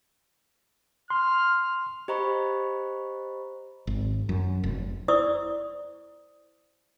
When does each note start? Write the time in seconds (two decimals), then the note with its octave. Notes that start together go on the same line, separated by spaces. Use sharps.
1.10 C6 F6
2.08 G4 C5 D#5 A#5 B5 C#6
3.87 G#1
4.29 F#2
4.64 F1
5.08 E4 C5 D5 C#6 D#6 E6